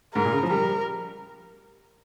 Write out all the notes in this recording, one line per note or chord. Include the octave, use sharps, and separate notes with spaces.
G#2 A#4
A#2
C#3
F3
G3 A#4